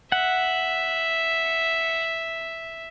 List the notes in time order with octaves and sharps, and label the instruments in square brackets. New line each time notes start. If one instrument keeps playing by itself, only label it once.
[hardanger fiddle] E5 [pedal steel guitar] F#5